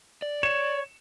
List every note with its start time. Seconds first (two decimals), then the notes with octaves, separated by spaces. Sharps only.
0.22 D5
0.43 C#5 C#7 E7